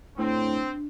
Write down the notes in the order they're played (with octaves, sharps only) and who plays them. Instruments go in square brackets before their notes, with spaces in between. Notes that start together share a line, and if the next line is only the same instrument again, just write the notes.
[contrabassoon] A2 [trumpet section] C4 [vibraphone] D4